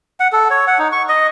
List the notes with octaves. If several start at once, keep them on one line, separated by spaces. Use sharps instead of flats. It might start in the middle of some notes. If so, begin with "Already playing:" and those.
F#5
A4
C#5
F#5
D#4
C#6
D#5